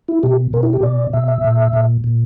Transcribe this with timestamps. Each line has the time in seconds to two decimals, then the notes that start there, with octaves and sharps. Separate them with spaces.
0.08 E4
0.23 B2 G4
0.53 B2 A#4
0.63 E4
0.73 G4
0.83 B2 D5
1.13 B2 E5
1.28 E5
1.44 A#2
1.73 A#2
2.04 A#2